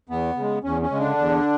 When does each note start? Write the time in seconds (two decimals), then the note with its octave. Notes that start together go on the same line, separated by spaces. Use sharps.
0.09 E2 B3
0.37 C#3
0.42 G#3
0.63 E2 C#4
0.82 C#4
0.91 C#3 G#3
1.00 D3 D4
1.18 E2